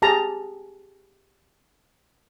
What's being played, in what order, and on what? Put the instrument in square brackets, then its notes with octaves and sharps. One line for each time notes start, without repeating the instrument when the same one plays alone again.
[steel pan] G4 G#4 A5 A#5